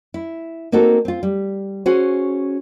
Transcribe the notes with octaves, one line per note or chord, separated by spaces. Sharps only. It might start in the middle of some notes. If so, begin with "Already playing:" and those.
E4
A#3 C4 D#4 F#4 A4
C4 F4
G3
C#4 F#4 G#4 C5